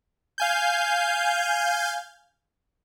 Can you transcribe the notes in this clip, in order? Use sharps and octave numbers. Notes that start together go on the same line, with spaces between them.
F5 G#5 G6